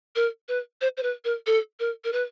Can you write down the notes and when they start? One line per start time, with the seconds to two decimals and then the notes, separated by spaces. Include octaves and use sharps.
0.16 A#4
0.48 B4
0.81 C5
0.97 C5
1.03 B4
1.25 A#4
1.47 A4
1.80 A#4
2.04 A#4
2.12 B4